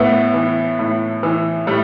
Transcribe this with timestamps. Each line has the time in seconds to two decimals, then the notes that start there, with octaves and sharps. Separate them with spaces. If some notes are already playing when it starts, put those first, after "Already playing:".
Already playing: A2 A3 B3
0.34 E3
0.79 A2
1.23 E3
1.67 A2 G3 A3